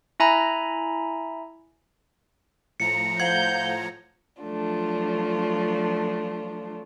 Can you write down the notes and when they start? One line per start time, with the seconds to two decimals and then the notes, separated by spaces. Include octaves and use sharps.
0.20 E4 E5 G#5 A#5 B5
2.80 A2 F3 A#5 C#7
3.20 C5 F5 F#5 G6 G#6
4.42 F3 F#3 A3 D4 F4